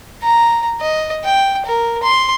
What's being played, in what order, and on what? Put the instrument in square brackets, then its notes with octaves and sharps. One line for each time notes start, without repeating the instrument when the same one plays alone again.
[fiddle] A#5
D#5
G5
A#4
C6